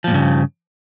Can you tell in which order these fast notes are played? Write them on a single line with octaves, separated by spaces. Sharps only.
F3 A#2 G2 C#3